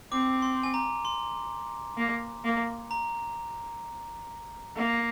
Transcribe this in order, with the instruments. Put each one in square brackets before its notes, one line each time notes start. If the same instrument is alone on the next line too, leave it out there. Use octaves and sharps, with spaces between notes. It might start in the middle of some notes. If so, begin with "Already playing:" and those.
[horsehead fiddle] C4 [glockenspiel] D6
[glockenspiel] C6
G#5
A#5
C6
[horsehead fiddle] A#3
A#3
[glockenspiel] A#5
[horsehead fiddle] A#3